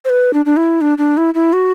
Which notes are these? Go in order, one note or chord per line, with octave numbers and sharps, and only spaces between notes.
C5
B4
D4
D4
E4
D4
D4
E4
E4
F#4